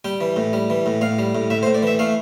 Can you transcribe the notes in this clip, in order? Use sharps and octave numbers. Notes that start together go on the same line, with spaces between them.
G3 G5
E3
A2
G3
E3
A2
A2 F5
G3
A2
A2 E5
C5
A2
D5
E3 E5
A3 F5